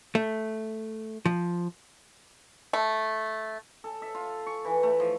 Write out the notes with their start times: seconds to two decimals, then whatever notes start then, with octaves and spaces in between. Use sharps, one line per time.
0.15 A3
1.26 F3
2.73 A3
3.84 A4
4.02 E5
4.15 F4
4.47 C#6
4.65 E3
4.83 A3
5.00 F3